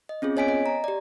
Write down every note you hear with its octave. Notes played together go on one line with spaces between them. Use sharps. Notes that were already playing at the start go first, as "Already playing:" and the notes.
D#5
C4 C#4 F4 G#4
B3 C#5 D#5 G#5 B6 D7
D#5
A#5
G4 D5